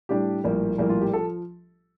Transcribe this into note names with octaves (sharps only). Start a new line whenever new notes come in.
A2 G3 D4 G4
A#1 A2 G3 A#3
A#1 A2 G3 A#3
F4
G4
F3 A4